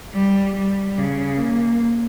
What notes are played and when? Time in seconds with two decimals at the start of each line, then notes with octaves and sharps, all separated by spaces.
0.14 G3
0.56 G3
0.98 C#3
1.38 A#3